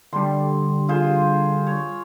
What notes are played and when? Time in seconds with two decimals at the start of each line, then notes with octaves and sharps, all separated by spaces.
0.13 D3 G3 C6
0.88 F4 G#4 C5
1.67 C#5